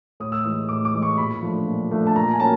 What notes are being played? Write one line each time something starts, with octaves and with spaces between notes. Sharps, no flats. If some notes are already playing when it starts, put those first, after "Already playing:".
A2 D#6
E6
E3 G#3 D#6
A2 D6
D6
E3 G#3
C#6
A#2 B5
F3 A3 D4
A#2
F3 A3 D4
A5
A#2 A#5
G#5
F#3 A#3 C#4 A5